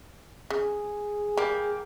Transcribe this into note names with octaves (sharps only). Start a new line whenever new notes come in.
C#3 G#4
G3 A#3 G4